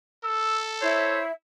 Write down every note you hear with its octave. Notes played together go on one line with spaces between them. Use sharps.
A4 E6
E4 C5 C#5 E5